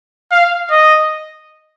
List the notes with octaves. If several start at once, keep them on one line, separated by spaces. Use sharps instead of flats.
F5
D#5